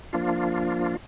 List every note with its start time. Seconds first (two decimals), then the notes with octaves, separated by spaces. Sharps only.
0.13 F3 A#3 D4 F4